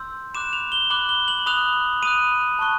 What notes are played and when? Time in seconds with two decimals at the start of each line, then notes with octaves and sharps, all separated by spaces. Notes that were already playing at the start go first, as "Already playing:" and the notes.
Already playing: C6 E6 G6
0.34 B5 D6 F#6 E7
0.53 F7
0.72 G7
0.90 B5 D6 F#6 F#7
1.09 G7
1.28 F#7
1.46 B5 D#6 F#6 F7
2.02 B5 D#6 F#6 D#7
2.59 A5 C#6 F#6